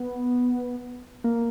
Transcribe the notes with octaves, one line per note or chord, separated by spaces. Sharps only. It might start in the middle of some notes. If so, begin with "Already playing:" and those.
Already playing: B3
A#3